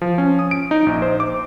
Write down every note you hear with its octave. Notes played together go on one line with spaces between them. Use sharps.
F3
C#4
D#6
D7
D#4
A#1
C5
D6